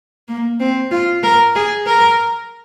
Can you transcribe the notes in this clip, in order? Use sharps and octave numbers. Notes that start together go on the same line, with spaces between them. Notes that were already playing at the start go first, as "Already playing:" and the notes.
A#3
C4
F4
A#4
G#4
A#4